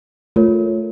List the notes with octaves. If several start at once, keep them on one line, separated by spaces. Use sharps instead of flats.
A3 F4 A#4 C#5